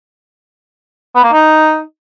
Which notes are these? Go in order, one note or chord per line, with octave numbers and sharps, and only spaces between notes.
B3
A#3
D#4